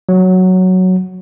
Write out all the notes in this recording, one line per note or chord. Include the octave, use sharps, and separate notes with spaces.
F#3